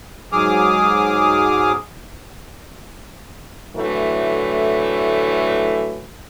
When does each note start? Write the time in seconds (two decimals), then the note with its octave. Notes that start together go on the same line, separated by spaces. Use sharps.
0.32 G#2 F#3 G#4 D6 D#6 F6
3.76 A2 D3 E3 F#3 A3